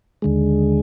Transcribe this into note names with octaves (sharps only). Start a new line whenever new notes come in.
D#2 D3 G#3